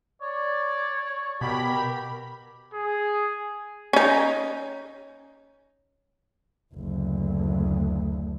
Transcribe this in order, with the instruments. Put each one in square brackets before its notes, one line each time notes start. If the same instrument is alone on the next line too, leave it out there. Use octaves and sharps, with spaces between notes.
[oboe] C#5 [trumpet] D5
[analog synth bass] B2 [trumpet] G4 [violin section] A#4 B5
[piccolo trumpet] G#4
[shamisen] C#4 D#4
[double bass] F#1 D2